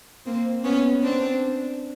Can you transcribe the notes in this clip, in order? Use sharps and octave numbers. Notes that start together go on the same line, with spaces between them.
A#3 C4
B3 C#4
C4 D4